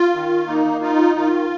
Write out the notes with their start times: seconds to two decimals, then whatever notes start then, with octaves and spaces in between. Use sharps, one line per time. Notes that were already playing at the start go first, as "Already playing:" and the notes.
Already playing: F4
0.14 D#3
0.47 A#3 D#4
0.81 D#4 F4
1.15 D#3 F4